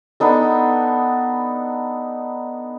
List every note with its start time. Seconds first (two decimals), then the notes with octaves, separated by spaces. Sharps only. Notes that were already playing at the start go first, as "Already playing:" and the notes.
0.20 B3 D4 D#4 A4